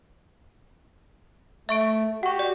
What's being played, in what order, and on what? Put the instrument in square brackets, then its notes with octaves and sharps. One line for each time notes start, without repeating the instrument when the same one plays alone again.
[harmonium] A3 [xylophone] E5 C#6 D7
[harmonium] F#4 G4 [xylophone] F#5 C#6
[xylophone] D5